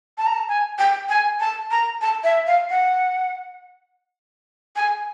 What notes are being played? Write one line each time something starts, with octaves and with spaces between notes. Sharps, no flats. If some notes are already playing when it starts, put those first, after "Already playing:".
A5
A#5
A5
G#5
G5
G#5
A5
A#5
A5
E5
F5
F#5
G#5